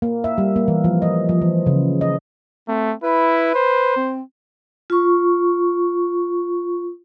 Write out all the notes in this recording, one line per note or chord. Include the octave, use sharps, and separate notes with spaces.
A#3
E5
G3
A#3
E3
F3
D#5
F3
E3
C#3
D#5
A3 C4
E4 B4
C5
C4
F4 C#6